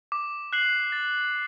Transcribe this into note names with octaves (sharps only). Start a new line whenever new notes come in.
D6
F#6 C7 F#7
A6